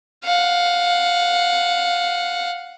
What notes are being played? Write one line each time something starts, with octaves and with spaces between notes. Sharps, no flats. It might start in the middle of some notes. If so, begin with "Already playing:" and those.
F5 F#5